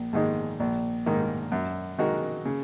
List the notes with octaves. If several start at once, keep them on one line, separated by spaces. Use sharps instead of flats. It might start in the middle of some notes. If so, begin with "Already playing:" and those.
Already playing: A#1
G#2 D#3 G#3
A#1
G#2 D#3 A#3 D#4
F#2
D#3 G#3 F#4 A#4
C#3